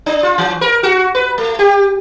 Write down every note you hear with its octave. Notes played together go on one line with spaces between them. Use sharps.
D4
F4
E3
A#4
F#4
B4
A3
G4